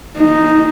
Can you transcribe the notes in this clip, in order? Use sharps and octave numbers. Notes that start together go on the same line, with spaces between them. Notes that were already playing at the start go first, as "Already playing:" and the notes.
D#4